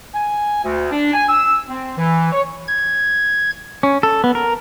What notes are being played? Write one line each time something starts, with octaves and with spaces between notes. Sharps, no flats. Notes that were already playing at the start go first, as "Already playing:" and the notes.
G#5
D2
D4
G#5
E6
C4
E3
C#5
G#6
C#4
A4
B3
A#4